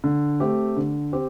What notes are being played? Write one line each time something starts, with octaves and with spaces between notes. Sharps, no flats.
D3
A3 C4 G4
D3
C4 G4